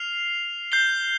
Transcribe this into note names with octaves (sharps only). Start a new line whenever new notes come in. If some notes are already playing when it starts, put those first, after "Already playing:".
Already playing: F6 C7 F7
G6 C7 G7